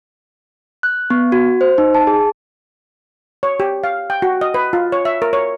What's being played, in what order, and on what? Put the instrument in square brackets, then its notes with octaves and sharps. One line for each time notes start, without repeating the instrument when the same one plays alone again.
[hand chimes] F#6
B3
F#4
C5
D#4
A5
G#4
[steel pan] C#5
G4
F5
G5
F#4
D#5
B4
F4
C#5
E5
A#4
C#5